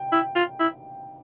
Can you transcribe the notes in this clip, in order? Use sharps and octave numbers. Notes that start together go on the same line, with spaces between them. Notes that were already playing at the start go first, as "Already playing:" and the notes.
Already playing: G5
E4
F4
E4